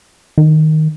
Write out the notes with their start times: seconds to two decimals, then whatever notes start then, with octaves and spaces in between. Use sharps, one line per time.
0.38 D#3